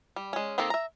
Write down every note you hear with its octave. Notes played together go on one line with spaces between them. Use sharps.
G3
G#3 C#4
D#3 A#3 C4 D#4 A4
E5 A#5